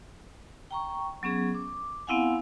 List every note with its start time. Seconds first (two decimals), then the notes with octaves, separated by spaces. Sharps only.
0.71 G5 A#5 C#6
1.23 F#3 B3 C#4 G#4
1.55 D6
2.07 B3 C4 E4 F5 F#5 G#5